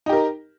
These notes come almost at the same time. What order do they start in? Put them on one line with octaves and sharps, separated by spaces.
D#4 G4 A#4